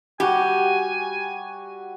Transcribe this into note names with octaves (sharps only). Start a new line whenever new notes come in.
G3 F#4 G4 G#5